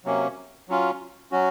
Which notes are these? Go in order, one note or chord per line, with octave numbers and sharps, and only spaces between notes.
C3 F#3 A#3 C#4
F#3 C#4 F4
F#3 C#4 F#4